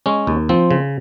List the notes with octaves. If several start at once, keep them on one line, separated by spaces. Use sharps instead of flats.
G#3 C#4
D#2
F3 C4
C#3